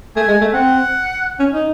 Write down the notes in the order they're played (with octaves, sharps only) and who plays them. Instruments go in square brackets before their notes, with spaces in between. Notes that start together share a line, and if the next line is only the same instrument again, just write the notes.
[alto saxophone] A3 [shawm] G#5
[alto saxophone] G#3
A3
[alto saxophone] C4 [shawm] F#5
[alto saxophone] C#4
D#4